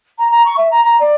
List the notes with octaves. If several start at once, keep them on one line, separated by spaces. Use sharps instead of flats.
A#5
A#5
C#6
E5
A#5
A#5
D5